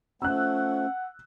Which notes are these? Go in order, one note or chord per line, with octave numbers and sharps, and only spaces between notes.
F3 A3 C#4 F#5 E6 F#6